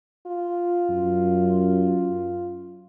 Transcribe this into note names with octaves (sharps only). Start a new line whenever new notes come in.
F4
F#2